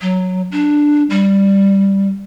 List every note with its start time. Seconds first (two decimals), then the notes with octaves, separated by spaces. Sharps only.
0.01 F#3
0.52 D4
1.10 G3